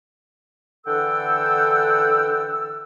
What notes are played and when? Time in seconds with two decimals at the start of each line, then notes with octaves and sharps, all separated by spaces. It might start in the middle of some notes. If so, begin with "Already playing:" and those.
0.86 D3 E3 A4 F#5 G5 E6